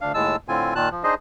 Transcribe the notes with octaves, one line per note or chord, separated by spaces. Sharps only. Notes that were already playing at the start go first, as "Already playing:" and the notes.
D2 D4 F5
D#2 A2 G#3 A5 E6
A2 D3 C4 F4 G#5
A#2 D#3 A5 F#6
F3
D4 D#4 G#4 C5 D#5